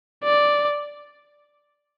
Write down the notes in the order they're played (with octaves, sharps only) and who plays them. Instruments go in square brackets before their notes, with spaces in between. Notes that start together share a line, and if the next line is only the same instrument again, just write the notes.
[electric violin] D5